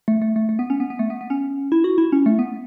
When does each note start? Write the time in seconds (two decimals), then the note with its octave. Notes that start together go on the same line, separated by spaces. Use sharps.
0.08 A3
0.22 A3
0.36 A3
0.49 A3
0.59 B3
0.70 C#4
0.80 B3
0.90 B3
0.99 A3
1.10 B3
1.21 B3
1.30 C#4
1.72 E4
1.84 F#4
1.98 E4
2.12 C#4
2.26 A3
2.39 B3